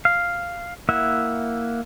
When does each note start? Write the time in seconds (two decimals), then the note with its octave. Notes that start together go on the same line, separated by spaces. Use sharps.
0.05 F5
0.89 A#3 E4 E5 F#5